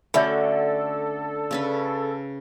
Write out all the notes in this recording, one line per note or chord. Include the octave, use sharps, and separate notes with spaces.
D3 A3 C#4 F#4 A4 C#5 E5 B5
C#3 C#4 B4